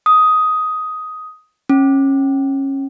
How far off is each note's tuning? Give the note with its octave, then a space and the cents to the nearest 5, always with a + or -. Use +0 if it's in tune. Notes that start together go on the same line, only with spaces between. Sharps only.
D#6 +10
C#4 -25